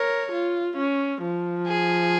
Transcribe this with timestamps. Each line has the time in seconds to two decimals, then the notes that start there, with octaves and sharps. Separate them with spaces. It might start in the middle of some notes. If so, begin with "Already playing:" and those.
Already playing: A#4 C#5
0.32 F4
0.78 C#4
1.22 F3
1.68 G#4